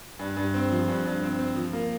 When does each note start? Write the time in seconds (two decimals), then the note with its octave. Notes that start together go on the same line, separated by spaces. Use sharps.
0.19 G2
0.37 G2
0.54 C4
0.71 F3
0.88 G2
1.05 G2
1.22 C4
1.39 C4
1.56 F3
1.73 A#3